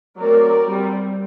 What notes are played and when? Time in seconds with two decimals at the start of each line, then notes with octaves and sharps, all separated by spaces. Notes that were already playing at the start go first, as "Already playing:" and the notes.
0.18 F#3 A3 C4 A#4 D5
0.67 G3 C4